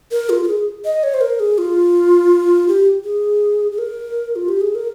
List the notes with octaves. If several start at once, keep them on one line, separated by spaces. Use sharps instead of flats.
A#4
F4
A#4
G#4
D#5
C#5
C5
A#4
G#4
F4
G4
G#4
G#4
A#4
F4
G4
G#4
A#4